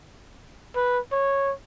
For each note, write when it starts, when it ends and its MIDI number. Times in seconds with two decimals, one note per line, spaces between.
0.76 0.99 71
1.12 1.53 73